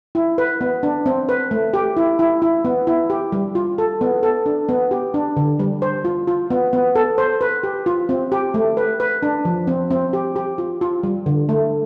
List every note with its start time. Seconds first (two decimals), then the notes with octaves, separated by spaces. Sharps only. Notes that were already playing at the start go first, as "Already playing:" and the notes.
0.15 E4
0.38 B4
0.61 B3
0.83 D4
1.06 C4
1.29 B4
1.51 A3
1.74 G4
1.97 E4
2.19 E4
2.42 E4
2.65 B3
2.87 E4
3.10 G4
3.32 G3
3.55 F4
3.78 A4
4.01 B3
4.23 A4
4.46 D4
4.69 B3
4.91 G4
5.14 D4
5.37 D3
5.59 G3
5.82 C5
6.05 F4
6.27 F4
6.50 B3
6.73 B3
6.95 A4
7.18 C5
7.41 B4
7.63 G4
7.86 F4
8.09 C4
8.32 G4
8.54 A3
8.77 B4
9.00 B4
9.23 D4
9.45 F3
9.67 C4
9.91 C4
10.13 G4
10.36 G4
10.58 F4
10.81 F4
11.03 G3
11.26 D3
11.49 A3